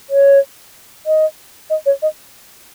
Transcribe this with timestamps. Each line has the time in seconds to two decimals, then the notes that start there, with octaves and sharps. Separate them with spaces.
0.10 C#5
1.06 D#5
1.70 D#5
1.86 C#5
2.02 D#5